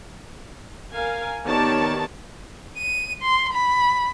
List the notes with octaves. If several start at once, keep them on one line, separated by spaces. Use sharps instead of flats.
A#4 F5 G#5
D#3 B3 G4 C#5 D5 A5
D#7
C6
B5